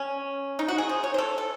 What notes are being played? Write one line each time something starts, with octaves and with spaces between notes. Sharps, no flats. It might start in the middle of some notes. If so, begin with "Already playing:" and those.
Already playing: C#4
D#4
F#4
G#4
C5
C#5
C5
A4
A4